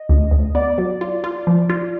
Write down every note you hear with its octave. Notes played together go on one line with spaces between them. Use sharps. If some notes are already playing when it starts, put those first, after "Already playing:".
Already playing: D#5
D2
D2
B3 D5
F#3
F4
F4
F3
F4